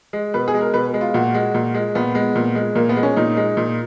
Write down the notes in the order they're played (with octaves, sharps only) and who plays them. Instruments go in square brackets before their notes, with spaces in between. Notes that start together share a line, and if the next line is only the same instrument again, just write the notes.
[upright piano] G#3
B2 B4
G#4
G#3
A#4
B2 B4
G#3
F4
A#2 F#4
G#3
A#2
G#3
A#2 B3
G#3
A#2
G#3
A#2 A#3
B3
G#3
C#4
A#2 D#4
G#3
A#2